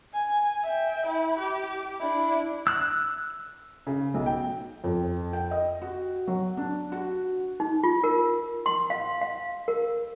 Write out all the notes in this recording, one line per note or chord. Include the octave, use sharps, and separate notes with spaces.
G#5
E5 G5
E4
G4
D4 E4
E6 F#6
C#3
B1
G5
F2
G5
D#5
F#4
F#3
D4
F#4
D#4
F4
A#4
C6
F5
F5
A#4